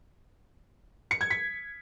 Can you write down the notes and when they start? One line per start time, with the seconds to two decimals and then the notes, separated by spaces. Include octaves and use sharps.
1.11 C#7
1.21 G#6
1.30 B6